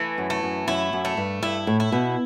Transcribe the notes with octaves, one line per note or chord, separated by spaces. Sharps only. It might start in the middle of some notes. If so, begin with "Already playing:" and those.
Already playing: E3 A3
F#2
A3
F#2
F#2 E4
F#2
A3
G2
G2 E4
A2
E4
B2